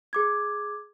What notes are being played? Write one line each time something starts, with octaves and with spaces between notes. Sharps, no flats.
G#4 D6 G#6